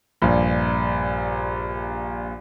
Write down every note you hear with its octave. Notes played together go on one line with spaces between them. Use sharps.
A#1 G2